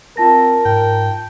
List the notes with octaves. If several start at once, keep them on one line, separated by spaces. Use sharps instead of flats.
C4 F4 A#4 A5 A#6
G#2 G5